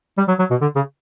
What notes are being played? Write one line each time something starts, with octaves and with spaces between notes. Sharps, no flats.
G3
F#3
F#3
B2
D3
C#3